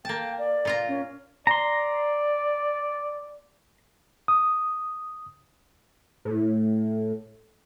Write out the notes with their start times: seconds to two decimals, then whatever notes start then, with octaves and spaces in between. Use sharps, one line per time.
0.05 A#3 G5 A5
0.38 D5
0.65 A#2 F4 A#5
0.88 C#4
1.47 D5 A#5 C6
4.28 D#6
6.25 A2